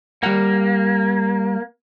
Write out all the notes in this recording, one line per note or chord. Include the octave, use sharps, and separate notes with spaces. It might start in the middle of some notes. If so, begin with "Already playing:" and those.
G3 A#3 F#5